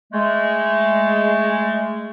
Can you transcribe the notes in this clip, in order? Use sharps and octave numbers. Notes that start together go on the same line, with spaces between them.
G#3 A3